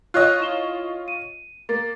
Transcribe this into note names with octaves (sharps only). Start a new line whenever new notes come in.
F4 C#5 D#5 F#6
E4 E7 G7
D#7
A#3 A6